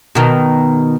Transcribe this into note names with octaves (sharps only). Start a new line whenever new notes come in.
B2 D#3